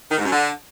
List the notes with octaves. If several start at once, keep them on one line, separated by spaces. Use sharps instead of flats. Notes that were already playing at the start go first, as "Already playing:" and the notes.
D#3
G#2
F#2
D3